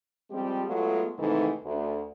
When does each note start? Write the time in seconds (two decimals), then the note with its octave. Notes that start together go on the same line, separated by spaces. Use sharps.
0.31 F3 G3 G#3 C4 G4
0.67 F#3 G#3 A3 B3 F4
1.18 G#2 C3 D#3 E3 A3
1.63 D2